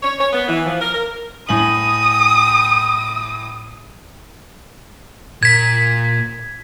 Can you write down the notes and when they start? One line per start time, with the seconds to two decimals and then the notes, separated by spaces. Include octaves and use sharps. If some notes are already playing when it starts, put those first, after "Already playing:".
0.03 C#5
0.19 C#5
0.33 B3
0.48 E3
0.66 F3
0.81 A#4
0.93 A#4
1.49 A2 G#5 D#6 F#7
5.43 A#2 G#6 B6